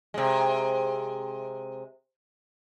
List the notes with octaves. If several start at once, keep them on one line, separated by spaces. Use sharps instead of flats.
C3 G#3